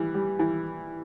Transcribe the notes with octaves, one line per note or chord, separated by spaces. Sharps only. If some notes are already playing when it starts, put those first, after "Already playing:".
Already playing: E3 G3
G3
E3